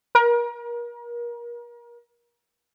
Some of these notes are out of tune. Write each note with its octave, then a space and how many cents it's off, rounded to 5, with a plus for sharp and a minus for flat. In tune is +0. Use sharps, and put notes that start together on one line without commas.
A#4 +35